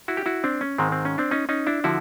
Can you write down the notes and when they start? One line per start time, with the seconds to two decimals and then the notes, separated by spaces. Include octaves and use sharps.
0.08 E4 F#4
0.17 G4
0.26 E4 F#4
0.44 C4 D4
0.61 C#4
0.78 G#2 D#3 G#3 C4
0.92 C4
1.05 C#4
1.18 C4 D4
1.31 C#4 D#4
1.49 C#4 D#4
1.67 D4 E4
1.84 D3 F3 E4 F#4